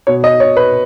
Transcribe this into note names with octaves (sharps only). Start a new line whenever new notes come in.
B2 C#5
D#5
C#5
B4